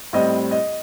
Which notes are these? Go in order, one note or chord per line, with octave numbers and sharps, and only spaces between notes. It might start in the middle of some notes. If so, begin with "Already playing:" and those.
A2 G3 C4 D#5
D#5